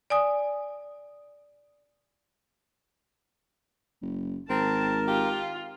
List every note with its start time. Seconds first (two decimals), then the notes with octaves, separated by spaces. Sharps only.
0.10 D5 G#5 D#6
4.02 F#1
4.50 G#1 C4 A#4 A5
5.08 F4 G4